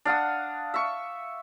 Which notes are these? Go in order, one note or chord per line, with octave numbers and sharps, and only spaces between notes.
D4 F5 F#5 D#6
E5 C#6